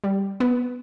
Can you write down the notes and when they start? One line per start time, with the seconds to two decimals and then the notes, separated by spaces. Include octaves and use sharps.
0.04 G3
0.40 B3